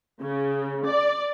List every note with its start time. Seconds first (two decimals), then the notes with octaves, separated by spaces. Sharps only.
0.22 C#3
0.86 D5